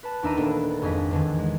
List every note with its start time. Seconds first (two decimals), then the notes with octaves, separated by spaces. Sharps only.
0.03 B4 A5
0.23 D#2 D4 D#4 E5 A#5 D#7
0.37 D#1 A#3 B3 D4 D#4 A4
0.82 G#1 F2 G#4 D#5 B6
1.11 E2 D3 D#3
1.39 G#3